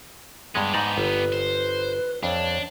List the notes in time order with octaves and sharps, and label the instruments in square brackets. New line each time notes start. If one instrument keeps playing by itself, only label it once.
[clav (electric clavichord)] G2 G#3 [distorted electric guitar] B3 G4
[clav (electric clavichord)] G#2 D#4 D5
[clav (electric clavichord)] G1 [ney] B4
[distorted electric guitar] C5
[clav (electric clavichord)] F2 [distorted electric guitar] D4 [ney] C#5